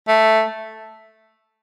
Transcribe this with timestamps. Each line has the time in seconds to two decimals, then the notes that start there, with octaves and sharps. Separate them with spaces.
0.08 A3